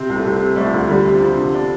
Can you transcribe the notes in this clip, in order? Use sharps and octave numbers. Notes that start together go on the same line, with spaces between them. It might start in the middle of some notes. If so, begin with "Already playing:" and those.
Already playing: C3 C4
C2
A3
C2
C3
G3 A3
F3
D2
D3 G3
C3
F3
C3
D3
D4